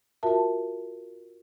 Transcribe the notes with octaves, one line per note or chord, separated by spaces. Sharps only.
F4 F#4 A#4 E5 A5